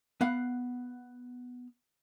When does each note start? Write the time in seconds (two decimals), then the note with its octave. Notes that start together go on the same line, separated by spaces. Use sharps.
0.21 B3 F5 F#5